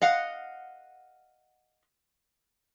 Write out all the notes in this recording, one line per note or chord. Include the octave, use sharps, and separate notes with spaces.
D#5 F5 F#5